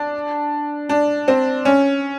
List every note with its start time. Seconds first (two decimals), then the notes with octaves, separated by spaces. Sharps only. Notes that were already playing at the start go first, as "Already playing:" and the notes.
Already playing: D4
0.89 D4
1.28 C4
1.65 C#4